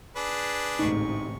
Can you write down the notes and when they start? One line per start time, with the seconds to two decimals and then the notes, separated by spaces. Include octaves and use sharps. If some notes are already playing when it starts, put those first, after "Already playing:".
0.16 D4 G#4 B4
0.79 A1 D2 G#2 C3 D#4 C#6